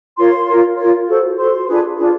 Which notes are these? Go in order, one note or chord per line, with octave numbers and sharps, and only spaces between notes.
F4 A#4 C#5 C6
F4 A#4 C#5
F4 A#4 C#5
F#4 A4 C5
F#4 A4 C5 C6
D4 F4 G#4 B4
D4 F4 G#4 B4